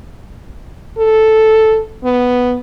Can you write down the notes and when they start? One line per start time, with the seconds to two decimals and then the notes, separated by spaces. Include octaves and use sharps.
0.98 A4
2.04 B3